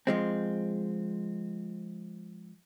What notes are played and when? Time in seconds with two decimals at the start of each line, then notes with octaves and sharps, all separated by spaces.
0.07 F3 G#3 C4